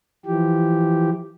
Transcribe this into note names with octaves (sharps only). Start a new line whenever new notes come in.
E3 F3 G4